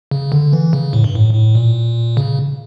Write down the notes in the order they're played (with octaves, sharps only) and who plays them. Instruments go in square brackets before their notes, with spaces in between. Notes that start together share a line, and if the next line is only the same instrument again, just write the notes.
[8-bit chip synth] C#3
D3
E3
C#3
A2
G2
A2
A2
A#2
C#3